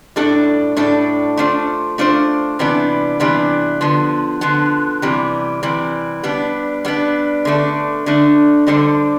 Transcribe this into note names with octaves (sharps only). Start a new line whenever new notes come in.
A2 G3 D4 A4
A2 G3 D4 A4
A3 D4 F4 C5
A3 D4 F4 C5
C3 E3 G3 B3 D4
C3 E3 G3 B3 D4
D3 F3 B3
D3 F3 B3
C3 E3 G3
C3 E3 G3
G3 B3 D4
G3 B3 D4
D3 A3 D4
D3 A3 D4
D3 G3 D4 A4 C5